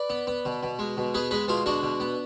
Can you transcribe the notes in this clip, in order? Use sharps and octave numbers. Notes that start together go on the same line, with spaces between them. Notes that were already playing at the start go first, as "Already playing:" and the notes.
Already playing: B4 D5
B3
B3
B2
B2
G#3
B2
B3 G#4 B4
G#3 G#4 B4
B2 F4 G#4
G#3 D4 F#4
B2
B3